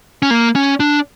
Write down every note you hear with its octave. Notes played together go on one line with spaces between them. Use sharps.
C#4
A#3
C#4
D4